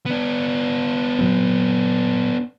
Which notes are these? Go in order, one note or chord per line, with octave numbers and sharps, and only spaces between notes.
B3 D4
A#2 F#3 C4